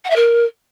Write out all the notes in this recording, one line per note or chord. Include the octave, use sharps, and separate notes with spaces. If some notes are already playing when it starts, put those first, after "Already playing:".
F#5
E5
A#4